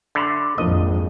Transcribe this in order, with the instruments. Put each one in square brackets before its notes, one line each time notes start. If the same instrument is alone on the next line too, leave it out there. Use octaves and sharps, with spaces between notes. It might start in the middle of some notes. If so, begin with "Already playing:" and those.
[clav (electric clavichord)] D3 [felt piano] E5 B5 C6
[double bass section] G#1 F2 [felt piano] F3 A#3 D4 [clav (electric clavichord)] D#5